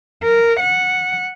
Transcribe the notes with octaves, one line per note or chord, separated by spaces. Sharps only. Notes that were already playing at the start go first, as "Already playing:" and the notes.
A#4
F#5